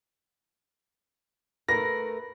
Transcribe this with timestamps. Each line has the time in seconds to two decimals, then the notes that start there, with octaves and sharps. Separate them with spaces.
1.68 A3 A#4 B4 A#6